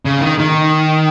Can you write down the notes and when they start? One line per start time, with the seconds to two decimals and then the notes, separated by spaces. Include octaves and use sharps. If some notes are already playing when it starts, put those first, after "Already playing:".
0.06 C#3
0.21 D#3
0.39 D#3